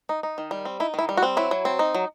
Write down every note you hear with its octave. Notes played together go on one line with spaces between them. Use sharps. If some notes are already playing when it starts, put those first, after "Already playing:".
D#4
D#4
D#3
G3
C4
D#4 E4
D#3 E4
G3
F#4
C4
F#3 E4
F#3
C4
D#4
F#3